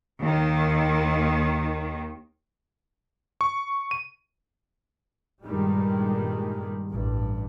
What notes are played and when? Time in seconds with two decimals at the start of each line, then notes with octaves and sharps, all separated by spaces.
0.21 D#2 D#3
3.41 C#6
3.91 D#7
5.43 G2 A#2 D#3 G3 G#3
6.89 A1 G2